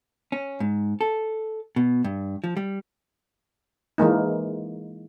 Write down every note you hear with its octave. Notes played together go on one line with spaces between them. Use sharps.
C#4
G#2
A4
B2
G2
F3
G3
E3 G#3 A#3 D#4